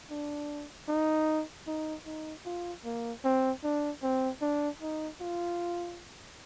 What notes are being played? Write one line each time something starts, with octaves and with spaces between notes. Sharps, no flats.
D4
D#4
D#4
D#4
F4
A#3
C4
D4
C4
D4
D#4
F4